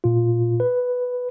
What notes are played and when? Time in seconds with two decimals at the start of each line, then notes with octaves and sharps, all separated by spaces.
0.04 A#2 F4
0.60 B4